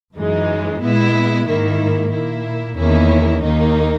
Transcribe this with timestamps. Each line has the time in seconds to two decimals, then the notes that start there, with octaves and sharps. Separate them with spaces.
0.17 F#2 E3 G#3 D#4
0.82 A#2 G#3 B3 E4
1.47 G#2 D#3 A#3 E4
2.12 A#2 A#3 E4
2.77 E2 D#3 A#3 C#4 E4
3.42 D#2 D#3 A#3 D#4